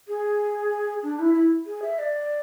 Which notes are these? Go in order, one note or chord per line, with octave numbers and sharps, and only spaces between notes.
G#4
D4
E4
E4
G#4
E5
D5